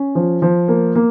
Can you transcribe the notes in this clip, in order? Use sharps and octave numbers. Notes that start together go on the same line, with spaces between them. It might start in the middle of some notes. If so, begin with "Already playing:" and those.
Already playing: C#4
F3
F3
A#3
A#3